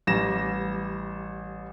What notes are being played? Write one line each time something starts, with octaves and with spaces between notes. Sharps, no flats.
A1 G3 A#6 E7